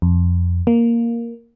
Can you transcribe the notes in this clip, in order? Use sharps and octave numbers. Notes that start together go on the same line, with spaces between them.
F2
A#3